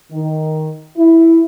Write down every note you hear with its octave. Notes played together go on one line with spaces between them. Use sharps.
D#3
E4